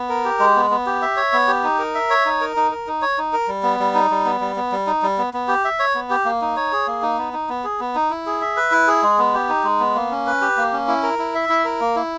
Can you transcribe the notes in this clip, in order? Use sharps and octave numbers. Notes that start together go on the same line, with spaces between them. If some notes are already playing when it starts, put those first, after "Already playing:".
Already playing: B3
A#4
G4
G#3
B3
B3
G4
E5
C#5
B3
G4
D#4
A#4
E5
C#5
D#4
A#4
D#4
A#4
D#4
C#5
D#4
A#4
G3
B3
G3
D#4
G3
B3
G3
B3
G3
D#4
G3
B3
B3
G4
E5
C#5
B3
G4
A#3
D#4
C#5
G#4
A#3
D#4
B3
D#4
B3
G#4
B3
D#4
E4
G#4
E5
B4
E4
G#4
G#3
B3
G4
D#4
G#3
B3
A#3
C#4
B4
G4
A#3
C#4
E4
A#4
E4
E5
E4
A#4
A#3
E4